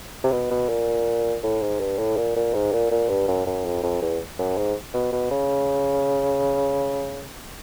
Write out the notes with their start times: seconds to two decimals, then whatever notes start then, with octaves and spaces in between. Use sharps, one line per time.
0.24 C3
0.32 B2
0.51 B2
0.69 A#2
1.43 A2
1.62 G#2
1.80 G2
1.98 A2
2.17 A#2
2.36 A#2
2.54 G#2
2.73 A#2
2.91 A#2
3.09 G2
3.28 F#2
3.46 F#2
3.65 F2
3.83 F2
4.02 E2
4.39 F#2
4.57 G#2
4.94 B2
5.12 B2
5.31 C#3